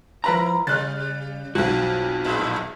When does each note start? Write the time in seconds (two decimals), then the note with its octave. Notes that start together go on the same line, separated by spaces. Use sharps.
0.24 F3 E4 A#4 B4 A#5
0.67 C#3 G3 F6 F#6 A6
1.55 B1 F2 F#4
2.25 A2 G#3 E4